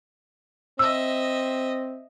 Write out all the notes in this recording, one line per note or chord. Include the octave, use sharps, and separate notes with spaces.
C4 D#5 E5 E6